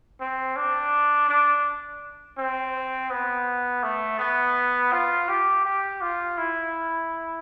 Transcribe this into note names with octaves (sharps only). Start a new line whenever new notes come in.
C4
D4
D4
C4
B3
A3
B3
F4
G4
G4
F4
E4